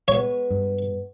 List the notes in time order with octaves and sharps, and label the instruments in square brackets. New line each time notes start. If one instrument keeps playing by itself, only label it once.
[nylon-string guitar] G#3 B3 [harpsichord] C#5
[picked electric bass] G2